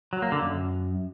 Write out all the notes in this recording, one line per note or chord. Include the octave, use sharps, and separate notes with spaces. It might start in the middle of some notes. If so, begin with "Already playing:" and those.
F#3
A#3
D3
F#2